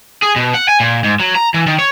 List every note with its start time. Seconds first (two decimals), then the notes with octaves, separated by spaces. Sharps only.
0.22 G#4
0.36 B2
0.54 F#5
0.68 G#5
0.80 A#2
1.04 G#2
1.20 F#3
1.35 A#5
1.54 E3
1.67 D#3
1.79 C#5